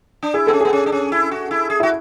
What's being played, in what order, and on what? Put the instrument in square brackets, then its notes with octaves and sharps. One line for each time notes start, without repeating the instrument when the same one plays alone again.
[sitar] D4
[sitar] E4 [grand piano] G#4
[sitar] B3 [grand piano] A4
[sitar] C#4
[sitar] B3 [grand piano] G#4
[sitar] C#4
D4
C#4
E4
F#4
E4
G#4
[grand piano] E4 [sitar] F#4